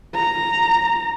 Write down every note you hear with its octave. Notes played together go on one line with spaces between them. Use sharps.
A#5